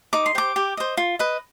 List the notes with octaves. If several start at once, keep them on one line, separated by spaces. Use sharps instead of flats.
D#4 D6
C6
G4 C5 D6
G4
C5 D#5
F4
B4 D#5